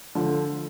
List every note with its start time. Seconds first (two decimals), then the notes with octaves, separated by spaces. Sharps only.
0.15 D3 F3